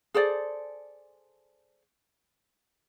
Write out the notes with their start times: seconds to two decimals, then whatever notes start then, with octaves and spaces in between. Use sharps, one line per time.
0.14 G#4 A4 C5 D5